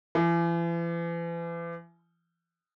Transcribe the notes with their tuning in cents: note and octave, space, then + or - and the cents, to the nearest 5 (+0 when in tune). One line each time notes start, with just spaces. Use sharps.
E3 +40